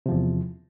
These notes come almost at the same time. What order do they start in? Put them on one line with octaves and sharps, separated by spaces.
C3 F3 E2